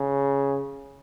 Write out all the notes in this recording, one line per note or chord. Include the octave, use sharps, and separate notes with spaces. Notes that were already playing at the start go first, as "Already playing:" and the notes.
Already playing: C#3